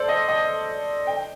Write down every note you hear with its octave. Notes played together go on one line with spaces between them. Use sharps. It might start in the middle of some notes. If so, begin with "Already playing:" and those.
Already playing: A4 C5 D5
D#5
D#5
G5